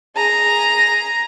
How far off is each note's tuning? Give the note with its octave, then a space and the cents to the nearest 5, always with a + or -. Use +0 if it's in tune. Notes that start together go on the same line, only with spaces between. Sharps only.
G#4 +0 A#5 +0